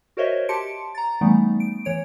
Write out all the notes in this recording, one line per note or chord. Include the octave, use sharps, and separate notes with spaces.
F#4 A#4 C5 C#5 D#5 E5
G4 A5 C6 C#7 D7
A#5 A6
E3 G3 A3 B3 D#4
D7
E3 C#5 D7